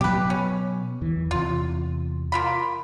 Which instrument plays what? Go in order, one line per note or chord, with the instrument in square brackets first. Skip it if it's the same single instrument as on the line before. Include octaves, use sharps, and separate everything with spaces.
[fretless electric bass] B2 F#3 B3 [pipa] G4 B4
[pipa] C#4
[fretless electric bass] E2 E3
[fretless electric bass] E2 C3 [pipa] F4
[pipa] A#3 F4 B5